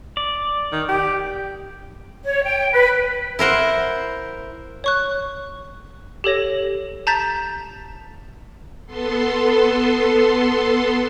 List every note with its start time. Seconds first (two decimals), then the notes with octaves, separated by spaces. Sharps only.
0.17 D5
0.72 D#3
0.88 G4
2.24 C#5
2.43 G5
2.72 B4
3.39 E4 A#4 C5 F#5
4.84 C#5 C#6 F#6
6.24 G4 A4 C#5 A#6
7.07 A5 A#5 G6 A6 B6 E7
8.86 B3 A4 C6